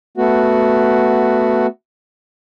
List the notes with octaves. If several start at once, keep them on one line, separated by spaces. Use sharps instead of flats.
A3 B3 F#4